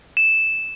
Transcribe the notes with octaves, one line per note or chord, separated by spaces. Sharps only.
E7